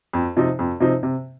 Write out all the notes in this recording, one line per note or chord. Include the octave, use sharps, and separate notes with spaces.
F2
C3 F3 C4 D#4
F2
C3 F3 C4 D#4
C3